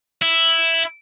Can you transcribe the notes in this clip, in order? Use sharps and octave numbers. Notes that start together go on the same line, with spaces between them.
E4